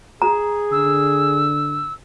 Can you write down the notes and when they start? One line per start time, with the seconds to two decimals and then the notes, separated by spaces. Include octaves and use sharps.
0.22 G#4 A#5
0.72 D3 E6